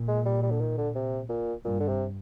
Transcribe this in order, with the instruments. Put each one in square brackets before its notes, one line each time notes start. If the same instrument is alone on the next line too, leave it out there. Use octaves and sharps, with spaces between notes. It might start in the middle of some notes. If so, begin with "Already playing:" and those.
Already playing: [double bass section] A#2
[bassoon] G#3
G3
G3
D3
D#3
D3
C3
A#2
[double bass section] G2 [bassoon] A#2
[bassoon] D3
C3